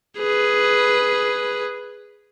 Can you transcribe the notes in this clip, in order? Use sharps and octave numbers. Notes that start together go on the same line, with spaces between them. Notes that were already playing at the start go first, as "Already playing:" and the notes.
G#4 B4